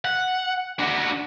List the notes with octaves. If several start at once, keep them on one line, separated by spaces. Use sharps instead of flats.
F#5
D4 F#4